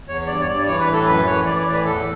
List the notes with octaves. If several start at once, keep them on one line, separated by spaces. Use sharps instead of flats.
E2 C#5
C#5
G2 D5
C#5
G2 D5
D5
E3 C#5
B4
A2
A4
F#2 B4
E3 C#5
E3 D5
D5
A2
B4
E2 A4